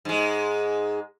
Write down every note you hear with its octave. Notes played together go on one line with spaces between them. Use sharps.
G#2 G#3